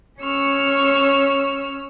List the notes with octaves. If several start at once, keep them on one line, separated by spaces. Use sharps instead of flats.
C#4 C#5 C#6 E6 F6